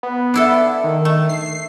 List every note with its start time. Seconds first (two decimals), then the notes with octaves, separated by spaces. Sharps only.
0.03 B3
0.34 D4 E4 A4
0.84 D#3
1.05 A3
1.29 C7